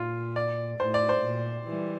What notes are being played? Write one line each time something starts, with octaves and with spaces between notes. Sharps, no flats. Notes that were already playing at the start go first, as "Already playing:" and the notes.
Already playing: A#2 F4
D5
A2 C5
D5
C5
A#2
E3 G3